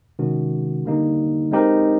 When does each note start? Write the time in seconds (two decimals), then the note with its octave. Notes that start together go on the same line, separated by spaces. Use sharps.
0.19 C3 D#3 G#3 C#4 F#4
0.85 D3 G3 A#3 D#4 G4
1.51 G#3 C4 D#4 G4 A#4